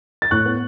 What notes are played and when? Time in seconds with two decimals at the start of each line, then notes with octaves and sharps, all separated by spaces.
0.22 A6
0.31 A2 C#6 F#6
0.46 B3